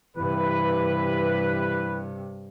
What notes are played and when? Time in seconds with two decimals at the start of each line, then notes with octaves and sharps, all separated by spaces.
0.17 G2 C3 E3 B4